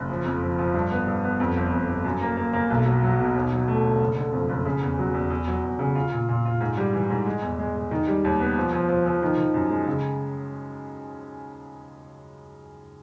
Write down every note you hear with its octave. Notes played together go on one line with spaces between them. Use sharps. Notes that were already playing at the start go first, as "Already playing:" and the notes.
Already playing: F#1
F3
F2
F3
F3
G2
B3
G2
B3
F2
G1
F2
G1
F#2
A#3
A#3
A#3
B1
F#3
F#3
B2
D#2
F#3
A3
D3
F#1
D3
F2
F#1
C#3
E2
F#3
E2
E2
F#3
E2
C#3
F4
A#2
A#2
F4
G#2
G3
E3
G#2
G#3
E2
G#3
G#3
D#3
G3
D#2
B3
F3
F3
F3
F3
D#3
D#3
F#2
G#3
C#3